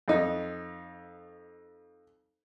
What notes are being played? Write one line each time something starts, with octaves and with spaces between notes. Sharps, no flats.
F2 D#4